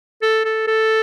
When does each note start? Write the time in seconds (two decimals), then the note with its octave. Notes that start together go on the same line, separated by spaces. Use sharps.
0.22 A4
0.45 A4
0.67 A4